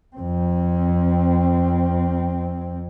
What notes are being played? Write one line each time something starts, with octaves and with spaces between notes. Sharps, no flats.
F2 C4